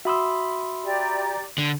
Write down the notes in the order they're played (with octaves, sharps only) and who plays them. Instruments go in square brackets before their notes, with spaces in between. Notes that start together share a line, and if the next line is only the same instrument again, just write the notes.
[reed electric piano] F#4 D#6 E6 [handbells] E5 B5 C6
[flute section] G4 D5 A#5
[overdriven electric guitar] D3